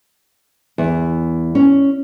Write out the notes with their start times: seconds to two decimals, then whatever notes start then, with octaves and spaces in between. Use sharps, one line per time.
0.78 E2
1.55 C#4